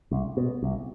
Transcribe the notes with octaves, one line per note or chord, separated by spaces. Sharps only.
C2
B2
C2